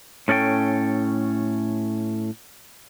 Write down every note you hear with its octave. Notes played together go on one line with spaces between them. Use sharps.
A2 C#4 A4 D5 G5